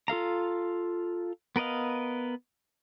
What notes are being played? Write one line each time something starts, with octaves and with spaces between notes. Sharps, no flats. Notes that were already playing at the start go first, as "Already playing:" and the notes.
F4 A4 F5 A#5
B3 A#4 B4 D#5 F5